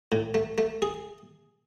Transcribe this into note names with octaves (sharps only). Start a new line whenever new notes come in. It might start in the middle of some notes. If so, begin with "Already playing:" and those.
A2
A3
A3
G#4